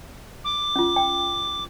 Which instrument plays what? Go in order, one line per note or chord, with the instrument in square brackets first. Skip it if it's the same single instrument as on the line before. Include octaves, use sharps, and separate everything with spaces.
[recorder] D6
[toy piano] C#4 F4
G5